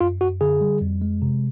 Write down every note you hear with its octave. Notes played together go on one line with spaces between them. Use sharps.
F#2 F4
F#2 F#4
D3 G#4
G3
F2
G#3
C3